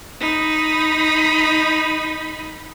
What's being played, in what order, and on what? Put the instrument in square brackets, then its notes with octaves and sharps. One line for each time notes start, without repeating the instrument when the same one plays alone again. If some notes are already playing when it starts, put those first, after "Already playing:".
[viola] D#4 B5